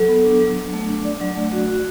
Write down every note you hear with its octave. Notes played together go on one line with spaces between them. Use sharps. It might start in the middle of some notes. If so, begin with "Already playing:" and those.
Already playing: F#3 A4
B3
D4
F#3
F#3
A3
D4
D5
F#3
A3
F#4
F#4